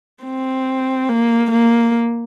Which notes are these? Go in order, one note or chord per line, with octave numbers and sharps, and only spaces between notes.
C4
A#3
A#3